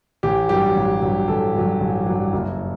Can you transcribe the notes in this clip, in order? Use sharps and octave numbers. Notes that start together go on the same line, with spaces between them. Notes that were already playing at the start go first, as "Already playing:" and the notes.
A1 G4
G2 F#3 G4
A1
G2 F#3
A1 A4
G2 F#3
A1
G2 F#3
F#1